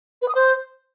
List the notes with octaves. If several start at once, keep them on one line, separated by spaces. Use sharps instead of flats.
B4
D#6
C5